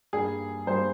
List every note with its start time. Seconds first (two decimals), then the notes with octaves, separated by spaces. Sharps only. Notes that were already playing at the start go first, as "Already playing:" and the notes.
0.13 G2 G3 A#3 G#4
0.67 G2 G3 A#3 C5